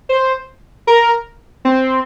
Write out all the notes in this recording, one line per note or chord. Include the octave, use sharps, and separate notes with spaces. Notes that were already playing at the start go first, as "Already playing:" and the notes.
C5
A#4
C4